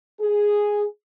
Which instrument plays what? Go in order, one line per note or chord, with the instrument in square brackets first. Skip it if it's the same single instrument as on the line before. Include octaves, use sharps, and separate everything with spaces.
[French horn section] G#4